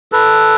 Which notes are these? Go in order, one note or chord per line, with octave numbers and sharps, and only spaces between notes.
A4 B4